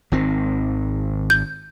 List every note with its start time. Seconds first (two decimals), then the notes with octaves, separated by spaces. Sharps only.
0.12 G#1 D#3 C4
1.30 G6